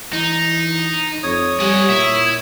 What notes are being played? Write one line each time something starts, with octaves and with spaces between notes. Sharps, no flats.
E3 D#4
F2 C#5 D#6
G3 G#4 F#5
A#2 E4 E5